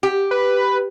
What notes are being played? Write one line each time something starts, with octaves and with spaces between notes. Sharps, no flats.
G4
B4